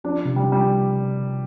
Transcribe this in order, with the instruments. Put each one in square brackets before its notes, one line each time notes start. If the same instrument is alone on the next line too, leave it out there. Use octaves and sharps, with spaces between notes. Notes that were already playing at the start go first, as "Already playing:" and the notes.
[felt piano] F3 [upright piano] D4
[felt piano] C3
[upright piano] G3
[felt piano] F3 [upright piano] G3